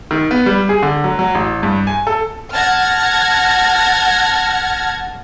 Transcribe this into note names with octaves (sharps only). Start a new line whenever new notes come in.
D#3
B3
G3
G#4
D3
F#3
F#3
A1
G2
G#5
A4
F#5 A5 F6 G#6 A#6